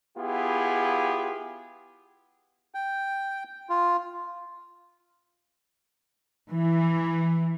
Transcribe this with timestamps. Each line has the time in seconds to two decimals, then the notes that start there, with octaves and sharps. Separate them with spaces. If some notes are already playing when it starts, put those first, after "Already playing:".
0.18 B3 E4 F4 G4 G#4
2.75 G5
3.70 F4
6.53 E3